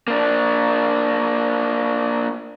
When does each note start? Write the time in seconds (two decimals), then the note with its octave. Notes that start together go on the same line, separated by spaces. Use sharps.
0.08 A#3 D4